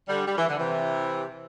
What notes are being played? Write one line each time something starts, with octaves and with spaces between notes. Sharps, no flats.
D3 G3
G3
E3
D3
C3 E3